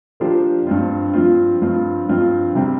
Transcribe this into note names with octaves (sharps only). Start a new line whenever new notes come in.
F3 A#3 D4 G4 C5
G2 F3 C4 F4
G2 F3 C4 F4
G2 F3 C4 F4
G2 F3 C4 F4
C3 G3 C4